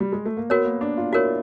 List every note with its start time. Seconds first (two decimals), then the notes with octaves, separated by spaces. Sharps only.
0.00 G3
0.12 G#3
0.26 A3
0.37 A#3
0.50 B3 F#4 A#4 C#5
0.65 A#3
0.81 D4
0.97 F4
1.12 E4 F#4 A#4 C#5